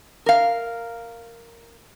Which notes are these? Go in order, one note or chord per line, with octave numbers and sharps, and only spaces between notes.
A#4 F5